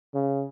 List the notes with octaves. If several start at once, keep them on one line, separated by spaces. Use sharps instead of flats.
C#3